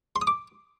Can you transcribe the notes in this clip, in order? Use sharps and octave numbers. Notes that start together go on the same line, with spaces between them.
C6
D#6
D6